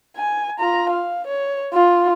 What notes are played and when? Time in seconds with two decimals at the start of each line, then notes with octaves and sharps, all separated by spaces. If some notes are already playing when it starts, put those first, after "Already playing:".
0.17 G#5
0.59 F4 A#5
0.90 F5
1.27 C#5
1.73 F4